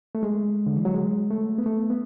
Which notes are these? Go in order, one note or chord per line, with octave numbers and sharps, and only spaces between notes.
A3
G#3
D3
E3
F#3
G#3
A3
B3
A3
B3